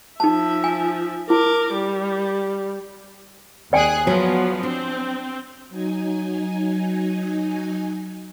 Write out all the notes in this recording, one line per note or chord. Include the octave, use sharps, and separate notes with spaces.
F3 D#4 E5 A5
G#5
E4 A#4 D6
G3
D#2 G#4 D5 G5 G#5 F#6
F3 F#3 B3
C4 D4
F#3 D#4 G#5